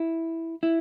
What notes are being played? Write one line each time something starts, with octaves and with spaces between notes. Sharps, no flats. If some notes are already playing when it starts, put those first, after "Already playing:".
Already playing: E4
E4